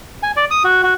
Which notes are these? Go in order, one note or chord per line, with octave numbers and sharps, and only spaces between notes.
G#5
D5
D#6
F#4
F#4